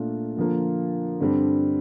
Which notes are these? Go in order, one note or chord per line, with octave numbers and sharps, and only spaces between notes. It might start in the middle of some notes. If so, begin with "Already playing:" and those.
Already playing: A#2 A3 D4 F4
D3 F3 A#3 F4
G2 D3 G3 C4